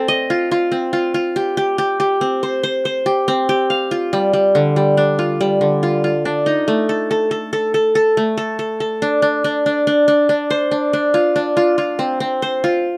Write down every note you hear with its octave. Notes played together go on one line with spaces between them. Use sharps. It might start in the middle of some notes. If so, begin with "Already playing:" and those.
Already playing: C4 A4
D#5
F4
F4
C4
F4
F4
G4
G4
G4
G4
C4
C5
C5
C5
G4
C4
G4
F5
F4
G3
G3
D3
G3
D4
F4
G3
D3
F4
F4
D4
D#4
A3
A4
A4
A4
A4
A4
A4
A3
A4
A4
A4
D4
D4
D4
D4
D4
D4
D4
C5
D4
D4
F4
D4
F4
F4
C4
C4
C5
F4